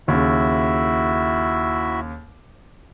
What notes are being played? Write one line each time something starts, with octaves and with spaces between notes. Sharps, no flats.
D#2 C#3 E4 F#4 E5